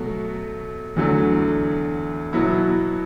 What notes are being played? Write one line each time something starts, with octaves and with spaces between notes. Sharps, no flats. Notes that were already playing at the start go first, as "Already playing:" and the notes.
Already playing: B2 F#3 A3
E2 D3 F#3 A3
B2 F#3 B3 E4